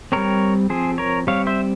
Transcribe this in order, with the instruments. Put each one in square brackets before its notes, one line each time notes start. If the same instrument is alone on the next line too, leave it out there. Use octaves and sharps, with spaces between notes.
[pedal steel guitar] G3 C4 A#4 C#5
F3 C4 G#4 C5
A#4 C#5
G3 C4 C#5 F5
C5 E5